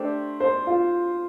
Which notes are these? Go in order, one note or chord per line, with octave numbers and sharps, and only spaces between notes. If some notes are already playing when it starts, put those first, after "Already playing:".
Already playing: A3 D4 G4 C5
C5
F4